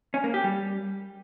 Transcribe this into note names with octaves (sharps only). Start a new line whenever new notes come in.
C#4
A#3
G4
G3